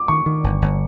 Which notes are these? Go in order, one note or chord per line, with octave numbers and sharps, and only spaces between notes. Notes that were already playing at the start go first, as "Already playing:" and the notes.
Already playing: D6
D#3 C#6
D#3
G1
G1